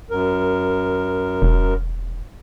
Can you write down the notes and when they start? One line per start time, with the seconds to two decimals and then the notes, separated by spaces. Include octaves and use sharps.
0.10 F#2 A#4
1.42 E1